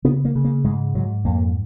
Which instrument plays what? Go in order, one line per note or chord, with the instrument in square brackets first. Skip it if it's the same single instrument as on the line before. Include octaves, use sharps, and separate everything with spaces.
[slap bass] C#3 B3
A#3
C#3
A#3
G#2 G#3
G#2 F#3
F2 A#3